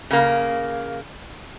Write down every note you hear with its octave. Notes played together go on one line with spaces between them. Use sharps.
C#3 A#3